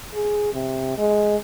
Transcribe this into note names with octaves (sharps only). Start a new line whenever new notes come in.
G#4
C3
G#3